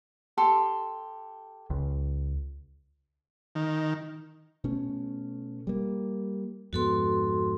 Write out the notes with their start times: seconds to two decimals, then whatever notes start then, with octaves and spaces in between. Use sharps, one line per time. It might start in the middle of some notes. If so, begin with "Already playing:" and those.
0.38 G4 A4 C6
1.70 C#2
3.55 D#3
4.64 B2 A3 C#4
5.67 G3 A#3
6.73 F2 G#2 B3 F#4 A4 C6